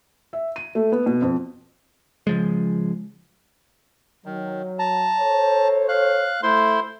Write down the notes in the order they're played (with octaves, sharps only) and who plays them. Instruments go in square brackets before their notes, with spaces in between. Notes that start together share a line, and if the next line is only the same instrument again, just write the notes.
[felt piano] E5
D#7
A3
B3
B2
F2
[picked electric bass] C#3 F3 G#3
[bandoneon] D#3 [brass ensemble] F#3
[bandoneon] A5 A#5
[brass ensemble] A4 C5 C#5
[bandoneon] F5 F#6
[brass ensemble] A3 [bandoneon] E4 C5 C6